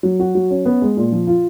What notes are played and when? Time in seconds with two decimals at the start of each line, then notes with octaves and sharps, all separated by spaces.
0.03 F#3
0.19 F#4
0.35 F#3
0.50 C#4
0.65 B3
0.82 G#3
0.97 A#2
1.12 F3
1.27 F4